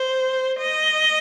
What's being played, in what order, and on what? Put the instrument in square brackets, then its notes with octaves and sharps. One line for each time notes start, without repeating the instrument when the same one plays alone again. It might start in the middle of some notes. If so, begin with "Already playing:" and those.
Already playing: [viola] C5
D#5